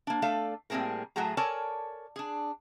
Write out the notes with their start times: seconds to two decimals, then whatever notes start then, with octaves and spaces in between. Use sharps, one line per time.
0.07 A#3 D4
0.22 A3 A4 D5 F5
0.70 A2 G3 A#3 C4 G#4 A#4
1.16 A2 F#3 A3 F#4 G#4 A#5
1.37 A4 A#4 C#5 D5 G#5 A5
2.16 D4 G#4